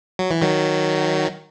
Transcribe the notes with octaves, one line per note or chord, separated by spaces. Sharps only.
F#3
E3
D#3 F#3